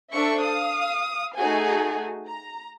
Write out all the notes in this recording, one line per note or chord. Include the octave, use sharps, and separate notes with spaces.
D4 A4 C5 E5 C#6
F5 D#6
A3 D#4 F#4 G#4 A4 G#5
A#5